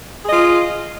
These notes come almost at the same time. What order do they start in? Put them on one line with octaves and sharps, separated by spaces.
G#4 D#5 F4